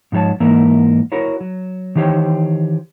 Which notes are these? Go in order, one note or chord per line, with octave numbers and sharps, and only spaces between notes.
G#2 F3 G4 C#5 A5
G#2 E3 A#3 A#4 E5
E4 F#4 A#4 C#5
F#3
D#3 E3 G4 C5 C#5 G5